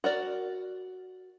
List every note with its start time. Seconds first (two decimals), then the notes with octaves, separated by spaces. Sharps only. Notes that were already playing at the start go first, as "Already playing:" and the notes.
0.04 F#4 A#4 D5